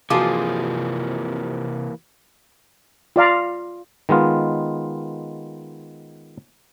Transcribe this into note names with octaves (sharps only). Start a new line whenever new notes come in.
C3 E3 F3 A#3 F4 F#4 G#4 D6
F4 D5 F5 A#5
D#3 G#3 B3 F4